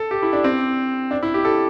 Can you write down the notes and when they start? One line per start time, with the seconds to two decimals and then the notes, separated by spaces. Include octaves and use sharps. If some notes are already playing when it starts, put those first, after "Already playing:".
Already playing: A4
0.11 G4
0.22 E4
0.33 D4
0.44 C4
1.11 D4
1.23 E4
1.34 G4
1.45 A4